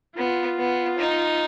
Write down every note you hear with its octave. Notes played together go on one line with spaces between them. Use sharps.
B3 F4
B3
D#4